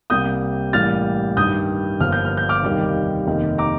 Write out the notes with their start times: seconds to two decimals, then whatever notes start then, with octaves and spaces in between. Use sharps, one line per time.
0.10 C2 C3 G3 A#3 D#6 G6
0.73 A1 A2 G3 A#3 F6 A6
1.37 G2 D#3 G3 D#6 G6
2.00 G1 G2 F3 A#3 F6
2.12 G6
2.25 F6
2.37 G6
2.49 D6 F6
2.63 F1 D#2 D#3 G3 A#3
3.27 F1 D#2 D#3 A#3
3.58 A#5 D6